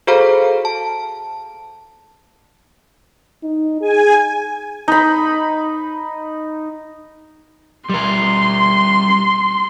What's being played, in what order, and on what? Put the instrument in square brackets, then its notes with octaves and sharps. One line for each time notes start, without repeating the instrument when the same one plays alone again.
[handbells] F#4 G#4 A4 C5 F5 A#5
A5
[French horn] D#4
[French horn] G#4 [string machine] G#5
[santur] D#4 B5
[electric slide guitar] G3 A#4 [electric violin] C6